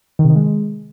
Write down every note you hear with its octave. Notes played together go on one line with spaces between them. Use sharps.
D#3
C3
D#3
G#3